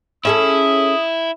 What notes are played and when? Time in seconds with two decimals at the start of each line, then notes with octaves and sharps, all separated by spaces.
0.25 C#4 E4 G#4 A4 D#6